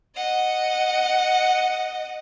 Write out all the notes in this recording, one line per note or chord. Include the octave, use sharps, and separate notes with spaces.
D#5 F#5